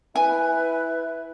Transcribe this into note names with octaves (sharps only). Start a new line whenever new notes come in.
E4 B4 G#5